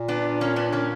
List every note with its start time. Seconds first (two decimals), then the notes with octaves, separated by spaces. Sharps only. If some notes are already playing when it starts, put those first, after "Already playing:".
Already playing: A#2
0.08 B3 D4
0.41 A#3 C#4
0.56 B3 D4
0.72 A#3 C#4